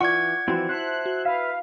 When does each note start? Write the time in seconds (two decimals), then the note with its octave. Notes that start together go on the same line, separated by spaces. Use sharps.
0.01 E3 F4 D5 F#5 C#6 D6 G#6
0.48 E3 F3 C4 E4 F#4
0.69 C5 E5 A5 F#6
1.06 F#4
1.25 B4 E5 F5